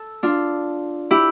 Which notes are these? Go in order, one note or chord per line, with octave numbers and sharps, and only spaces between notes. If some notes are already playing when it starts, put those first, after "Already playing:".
Already playing: A4
D4 F4
E4 G4